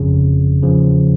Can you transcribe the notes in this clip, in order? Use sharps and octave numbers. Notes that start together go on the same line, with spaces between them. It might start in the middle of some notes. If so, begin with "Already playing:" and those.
Already playing: G1 F2 C#3
E2 C#3 F3